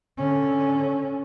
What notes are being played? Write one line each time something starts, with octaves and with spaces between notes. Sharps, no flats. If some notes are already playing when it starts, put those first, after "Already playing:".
D3 C#4